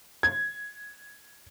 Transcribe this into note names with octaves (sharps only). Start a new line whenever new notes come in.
G#6